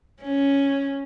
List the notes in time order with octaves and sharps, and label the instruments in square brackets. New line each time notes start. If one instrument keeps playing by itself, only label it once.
[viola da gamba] C#4